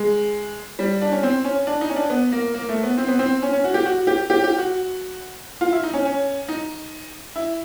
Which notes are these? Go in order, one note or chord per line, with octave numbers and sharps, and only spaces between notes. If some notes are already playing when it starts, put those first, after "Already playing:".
Already playing: G#3
G3
D4
C#4
C4
C#4
D4
D#4
C#4
D4
B3
A#3
A#3
A3
B3
C4
B3
C4
C#4
C#4
F#4
G4
F#4
G4
G4
G4
F#4
F4
E4
D#4
C#4
C#4
D#4
E4